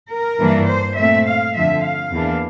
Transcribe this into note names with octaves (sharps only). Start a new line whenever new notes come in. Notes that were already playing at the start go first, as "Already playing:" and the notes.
A#4
G2 E3 A#3 D4
C5
A#2 A3 C4 E5
F5
F2 D3 F3 E5
F5
E2 E3 A#3 D4